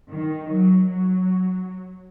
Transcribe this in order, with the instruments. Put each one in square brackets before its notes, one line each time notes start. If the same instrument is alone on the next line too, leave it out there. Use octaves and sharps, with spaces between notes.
[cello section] D#3
F#3
F#3